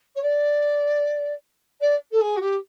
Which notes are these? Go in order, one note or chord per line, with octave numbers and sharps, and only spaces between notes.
C#5
D5
D5
A4
G#4
F#4
G4